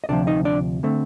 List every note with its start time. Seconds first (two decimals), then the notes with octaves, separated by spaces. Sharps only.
0.04 D#5
0.09 D2 C3 F3 D4 D5
0.27 D#4 D#5
0.45 D4 D5
0.83 D3 A3 C4